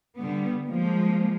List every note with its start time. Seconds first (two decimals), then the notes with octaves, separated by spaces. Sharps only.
0.17 D3 G3 B3
0.64 F3 G#3 A#3